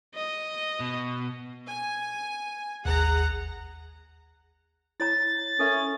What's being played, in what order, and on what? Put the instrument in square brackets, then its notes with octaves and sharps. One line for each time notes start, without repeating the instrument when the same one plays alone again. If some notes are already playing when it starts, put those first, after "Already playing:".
[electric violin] D#5
[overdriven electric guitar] B2
[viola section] G#5
[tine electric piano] G#1 D#2 [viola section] G#4 F#5 A#5
[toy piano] E4 C#5 A#5 [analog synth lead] A6
[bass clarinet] C#4 [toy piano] A4 A#4 E5